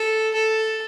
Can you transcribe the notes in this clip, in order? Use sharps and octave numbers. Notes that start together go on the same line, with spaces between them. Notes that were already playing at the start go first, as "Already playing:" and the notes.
Already playing: A4
A4